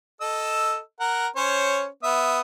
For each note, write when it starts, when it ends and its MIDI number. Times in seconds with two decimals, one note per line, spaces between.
0.21 0.79 69
0.21 0.79 75
0.21 0.79 88
1.00 1.27 70
1.00 1.27 78
1.36 1.86 61
1.36 1.86 72
1.36 1.86 73
2.03 2.41 59
2.03 2.41 76
2.03 2.41 87